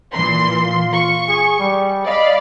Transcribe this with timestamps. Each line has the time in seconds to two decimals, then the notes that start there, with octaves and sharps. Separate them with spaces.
0.14 A#2 E3 C6
0.62 F4
0.92 F4 C#6
1.28 G#4
1.59 G3
2.06 D5 D#5 F5 B5